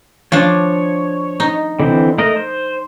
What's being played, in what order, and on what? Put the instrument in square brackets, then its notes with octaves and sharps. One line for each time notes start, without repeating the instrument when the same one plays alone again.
[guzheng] F3 D4 [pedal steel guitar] C#5
[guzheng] D#4
[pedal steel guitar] D3 E3 C4
A3 A#4 D#5
C5